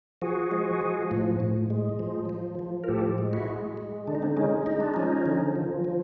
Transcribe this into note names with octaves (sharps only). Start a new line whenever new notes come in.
F3 F#4 G#4
G#3
F3
A2
A2
G#3
F3
F3
F3
A#4
A2 G4 A4
G#3
E4 F#4
G#3
G#3
D3 D4
D#4
C4 D4
G#3 C#4 D#4
G#3 D#4
D4
F3 C#4 D#4
D3
F3
F3